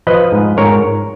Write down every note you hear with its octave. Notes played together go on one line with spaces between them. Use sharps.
F3 B4 D#5
G#2
G#2 A#4 C#5